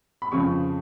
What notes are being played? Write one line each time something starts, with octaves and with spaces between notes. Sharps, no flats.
B5
F2 C#3 F3 C#6